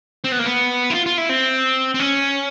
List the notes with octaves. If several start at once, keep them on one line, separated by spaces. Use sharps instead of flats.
C4
B3
A#3
B3
E4
F4
F4
E4
C4
C4
C#4